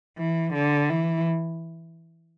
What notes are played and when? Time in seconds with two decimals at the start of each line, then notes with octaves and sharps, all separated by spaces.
0.18 E3
0.54 D3
0.89 E3